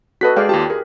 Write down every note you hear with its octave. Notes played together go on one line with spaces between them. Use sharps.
F#4 A4 B4 D#5 F#6 B6
G#3 G#4 D5 F5 G5
D#2 F4 G4 A5
G#4 A#4